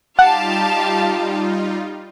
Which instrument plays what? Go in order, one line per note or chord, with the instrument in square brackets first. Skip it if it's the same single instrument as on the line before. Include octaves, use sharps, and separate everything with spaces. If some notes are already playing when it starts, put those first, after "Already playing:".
[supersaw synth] G3 D#4 F4 [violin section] G4 F5 A5 [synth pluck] F#5